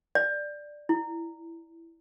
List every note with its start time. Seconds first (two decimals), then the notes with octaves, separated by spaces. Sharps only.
0.15 D5
0.89 E4